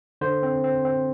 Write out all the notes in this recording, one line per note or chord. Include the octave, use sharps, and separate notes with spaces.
D3 C5
C4
C4
C4